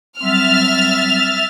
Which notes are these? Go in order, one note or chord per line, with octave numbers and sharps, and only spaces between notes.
F#3 G3 C4 E5 F6 A6